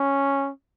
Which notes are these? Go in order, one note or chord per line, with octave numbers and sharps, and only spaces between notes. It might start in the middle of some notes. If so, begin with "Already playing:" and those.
Already playing: C#4